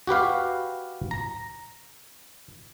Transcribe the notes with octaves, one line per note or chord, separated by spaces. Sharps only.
F#4 G4 B4 F5
A#5